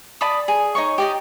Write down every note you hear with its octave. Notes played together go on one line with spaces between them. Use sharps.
D5 A5 B5 D#6
G#4
D#4 C#5 C#6
G4 D5 D#5